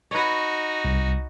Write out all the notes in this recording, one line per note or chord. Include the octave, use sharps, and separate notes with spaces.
D#4 F#4 B4 C#5
C2